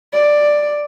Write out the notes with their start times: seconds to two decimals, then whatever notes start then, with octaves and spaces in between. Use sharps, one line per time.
0.13 D5